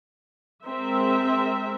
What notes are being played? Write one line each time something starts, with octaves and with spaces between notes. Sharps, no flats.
G#3 C4 A#4 E5